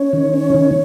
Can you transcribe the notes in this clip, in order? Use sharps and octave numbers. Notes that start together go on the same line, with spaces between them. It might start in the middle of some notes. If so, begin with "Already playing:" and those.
Already playing: C#4 C#5
D#3
C#4
D#3